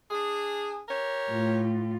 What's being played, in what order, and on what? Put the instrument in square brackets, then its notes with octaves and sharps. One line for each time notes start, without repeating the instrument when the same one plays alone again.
[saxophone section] D4 G#4
G4 A#4 C#5
[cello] A2 F4